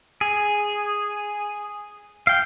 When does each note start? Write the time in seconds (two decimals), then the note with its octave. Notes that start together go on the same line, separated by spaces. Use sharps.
0.21 G#4
2.27 F5 G5